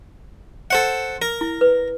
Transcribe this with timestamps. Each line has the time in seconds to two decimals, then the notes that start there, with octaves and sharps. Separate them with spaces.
0.71 A4 C5 F#5
1.22 A#4
1.41 E4
1.61 B4